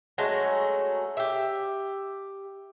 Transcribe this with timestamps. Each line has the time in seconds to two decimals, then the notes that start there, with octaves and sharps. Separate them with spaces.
0.18 F#3 G#3 A3 C#4
1.17 G4 E5